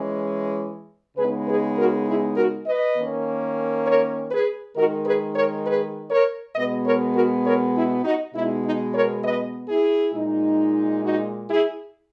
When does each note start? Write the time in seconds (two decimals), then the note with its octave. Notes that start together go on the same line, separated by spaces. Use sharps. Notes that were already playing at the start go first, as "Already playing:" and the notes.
Already playing: E3 G#3 C#4
1.17 C#3 G#3 B3 D#4 G#4 B4
1.47 G#4 B4
1.77 F#4 A#4
2.08 E4 G#4
2.37 F#4 A#4
2.67 B4 D#5
2.97 D#3 A#3 C#4
3.87 A#4 C#5
4.31 G#4 B4
4.76 D#3 G#3 D#4 F#4 A#4
5.06 G#4 B4
5.36 A#4 C#5
5.66 G#4 B4
6.11 A#4 C#5
6.55 B2 G#3 B3 B4 D#5
6.85 A#4 C#5
7.15 F#4 A#4
7.45 A#4 C#5
7.74 E4 G#4
8.04 D#4 F#4
8.34 B2 G#3 B3 D#4 E4
8.65 D#4
8.94 A#4 C#5
9.24 B4 D#5
9.69 E4 G#4
10.14 A#2 G#3 D#4
11.04 D#4 F#4
11.48 E4 G#4